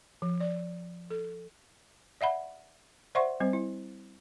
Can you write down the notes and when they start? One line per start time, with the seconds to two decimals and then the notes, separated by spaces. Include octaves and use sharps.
0.22 F3
0.40 D5
1.10 A4
2.21 D5 E5 F#5 B5
3.15 C5 D5 E5 F#5 C6 C#6
3.40 G3 C4 C5
3.53 E4